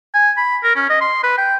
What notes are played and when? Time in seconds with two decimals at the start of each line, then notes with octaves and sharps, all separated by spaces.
0.14 G#5
0.37 B5
0.63 A#4
0.75 C#4
0.90 D#5
1.01 C6
1.23 B4
1.38 G5